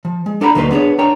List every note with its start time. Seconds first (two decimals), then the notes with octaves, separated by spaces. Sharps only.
0.05 F3
0.26 G#3
0.41 D4 A4 D5 F#5 A#5 B5
0.55 D2 F#3 A#3 D#4 B4 C6
0.71 B3 D4 G4 G#4 C#5
0.99 D4 A#4 C#5 G5 A#5